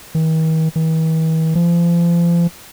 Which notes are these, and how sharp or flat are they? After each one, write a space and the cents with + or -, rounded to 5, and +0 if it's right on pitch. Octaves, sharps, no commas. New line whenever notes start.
D#3 +45
E3 -45
F3 -35